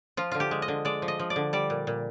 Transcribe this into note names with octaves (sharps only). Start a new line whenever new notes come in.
F3 F4
D3 F4
G4
G#3
D#5
D3
G#3 D5
F3
D#5
F3
D5
D3
G3 D5
A#2
A#2